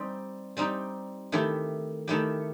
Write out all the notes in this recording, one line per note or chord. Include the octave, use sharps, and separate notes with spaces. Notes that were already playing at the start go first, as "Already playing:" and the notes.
Already playing: G3 C4 D#4 G4
G3 C4 D#4 G4
D#3 A3 E4 G4
D#3 A3 E4 G4